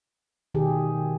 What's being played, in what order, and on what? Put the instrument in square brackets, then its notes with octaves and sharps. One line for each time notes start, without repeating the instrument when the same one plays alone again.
[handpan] B2 D#3 G4 G#4